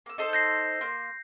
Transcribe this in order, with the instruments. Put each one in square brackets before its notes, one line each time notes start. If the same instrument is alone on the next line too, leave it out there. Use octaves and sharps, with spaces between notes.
[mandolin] A#3 E6
D#4 A4 C5
[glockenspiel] G6 A#6 C7
[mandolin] A#3 C6